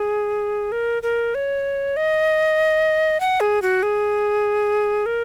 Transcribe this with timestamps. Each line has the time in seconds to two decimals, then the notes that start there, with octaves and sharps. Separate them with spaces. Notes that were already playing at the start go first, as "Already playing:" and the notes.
Already playing: G#4
0.72 A#4
1.03 A#4
1.35 C#5
1.96 D#5
3.20 F#5
3.40 G#4
3.62 F#4
3.83 G#4
5.06 A#4